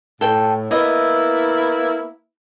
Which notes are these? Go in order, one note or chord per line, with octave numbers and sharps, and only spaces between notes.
A2 A4 G5
A#3 B3 E4 D#5